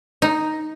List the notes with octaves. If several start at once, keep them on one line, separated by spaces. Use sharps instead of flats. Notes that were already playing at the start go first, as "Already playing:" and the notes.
D#4